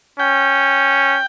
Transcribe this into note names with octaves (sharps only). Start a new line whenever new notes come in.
C#4 G5